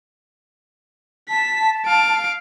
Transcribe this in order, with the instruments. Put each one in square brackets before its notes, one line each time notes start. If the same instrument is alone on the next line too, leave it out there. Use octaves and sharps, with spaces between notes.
[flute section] A5 [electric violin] B6
[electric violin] F5 D7